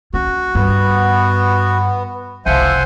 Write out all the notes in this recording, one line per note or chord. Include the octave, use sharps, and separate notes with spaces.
C#4 F#4
G2 B3
F#1 C2 F3 C5 E5 F#5 G#5